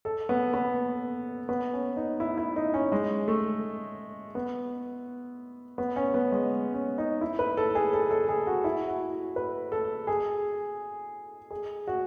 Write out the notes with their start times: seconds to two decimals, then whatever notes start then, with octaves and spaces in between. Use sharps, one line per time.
0.05 A4
0.29 B3
0.54 B3
1.49 B3
1.73 C#4
1.97 D#4
2.20 E4
2.37 E4
2.56 D#4
2.74 C#4
2.92 G#3
3.28 A3
4.35 B3
5.78 B3
5.96 C#4
6.14 B3
6.32 G#3
6.74 C#4
6.98 D#4
7.21 E4
7.39 B4
7.57 A4
7.75 G#4
7.93 A4
8.11 A4
8.29 G#4
8.47 F#4
8.64 E4
8.88 F#4
9.36 B4
9.72 A4
10.07 G#4
11.51 G#4
11.87 F#4